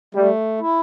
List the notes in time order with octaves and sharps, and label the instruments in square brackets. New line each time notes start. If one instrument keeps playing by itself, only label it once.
[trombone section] G3 [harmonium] A3
[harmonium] E4